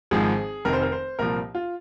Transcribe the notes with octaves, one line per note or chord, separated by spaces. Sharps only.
G#1 G#2 F3 G#4
F1 F2 D#3 A#4
C5
A#4
C5
C2 A#2 F3 A#4
F4